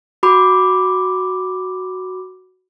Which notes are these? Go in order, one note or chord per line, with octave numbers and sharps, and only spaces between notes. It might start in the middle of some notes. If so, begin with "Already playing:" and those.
F#4 B5 D6